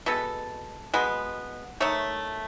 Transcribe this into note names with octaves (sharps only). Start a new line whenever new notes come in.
B2 G#3 B3 A4
B2 G#3 B3
D#3 A3 C#5